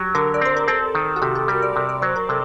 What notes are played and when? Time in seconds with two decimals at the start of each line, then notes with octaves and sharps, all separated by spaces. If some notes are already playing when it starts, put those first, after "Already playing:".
Already playing: F#3 G4
0.15 D3 A#4
0.34 D5
0.41 C4 C5
0.57 A#4
0.68 C4 A4
0.95 D#3
1.16 F#4
1.22 C3 G4
1.35 A4
1.48 G3 A#4
1.62 D5
1.76 C3
1.89 D5
2.02 F#3 C5
2.16 A#4
2.29 C3 A4